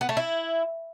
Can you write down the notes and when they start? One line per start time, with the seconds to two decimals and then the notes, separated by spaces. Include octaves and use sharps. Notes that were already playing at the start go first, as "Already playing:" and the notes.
0.01 B3
0.09 A3
0.17 E4